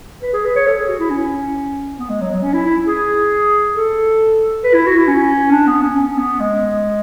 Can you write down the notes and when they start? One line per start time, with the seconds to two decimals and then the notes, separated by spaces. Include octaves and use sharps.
0.22 B4
0.33 G#4
0.45 B4
0.56 C#5
0.67 A4
0.77 G#4
0.89 F#4
1.00 E4
1.10 C#4
1.99 B3
2.10 G#3
2.21 F#3
2.32 F#3
2.43 C#4
2.54 E4
2.65 E4
2.87 G#4
3.76 A4
4.64 B4
4.74 E4
4.86 F#4
4.97 E4
5.08 C#4
5.52 D4
5.67 B3
5.81 C#4
5.96 C#4
6.17 B3
6.40 G#3